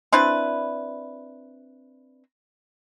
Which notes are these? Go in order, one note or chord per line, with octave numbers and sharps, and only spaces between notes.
C4 D4 E4 B4